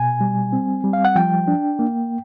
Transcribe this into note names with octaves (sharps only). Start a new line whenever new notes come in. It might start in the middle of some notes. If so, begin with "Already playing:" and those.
Already playing: B2 G#5
G3
C4
G3
F5
F#5
F3 G5
D4
A#3